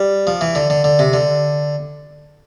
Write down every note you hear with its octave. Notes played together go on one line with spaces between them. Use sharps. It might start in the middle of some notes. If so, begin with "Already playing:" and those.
Already playing: G3
F3
E3
D3
D3
D3
C3
D3